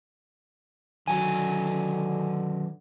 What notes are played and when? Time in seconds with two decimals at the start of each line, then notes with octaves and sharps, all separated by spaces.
1.08 D3 D#3 F#3 G#5